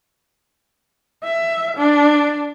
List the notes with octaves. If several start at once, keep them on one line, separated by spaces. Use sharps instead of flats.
E5
D4